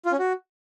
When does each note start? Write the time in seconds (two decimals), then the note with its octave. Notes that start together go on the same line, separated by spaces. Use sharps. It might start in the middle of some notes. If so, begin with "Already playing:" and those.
0.05 F4
0.12 C#4
0.19 F#4